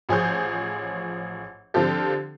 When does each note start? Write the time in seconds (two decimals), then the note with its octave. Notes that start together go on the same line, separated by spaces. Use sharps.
0.09 A1 F3 G#4 C5 C#5 G6
1.74 D3 F3 C4 F4 G4 A4